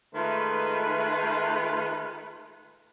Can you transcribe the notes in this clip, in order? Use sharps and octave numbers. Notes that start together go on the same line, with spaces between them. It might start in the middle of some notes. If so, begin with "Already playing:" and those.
D#3 G#3 A3 F4 B4